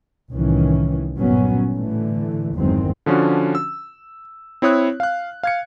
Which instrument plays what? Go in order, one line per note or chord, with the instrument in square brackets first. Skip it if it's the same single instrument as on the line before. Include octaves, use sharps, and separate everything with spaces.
[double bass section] C2 A2 D#3 E3 C#4
G1 A#2 F#3 B3 C#4
A2 D3 E3 A3
G1 E2 D#3 F#3 G#3 C4
[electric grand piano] D3 F3 C#4 D4 F#4
E6
C4 E4 C#5 D#6 F#6
F5 F#6
F5 G#6 C#7